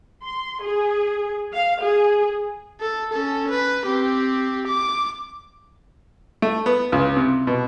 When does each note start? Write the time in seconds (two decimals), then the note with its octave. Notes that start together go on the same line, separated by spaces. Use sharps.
0.23 C6
0.62 G#4
1.53 F5
1.82 G#4
2.80 A4
3.12 C#4 A4
3.50 B4
3.84 C4 G4
4.67 D6
6.42 A3
6.66 B3
6.92 C#2
7.17 C3
7.47 B2